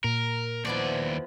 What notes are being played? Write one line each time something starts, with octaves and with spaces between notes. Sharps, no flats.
A#2 A#4
D#2 F3 B3 E4 D5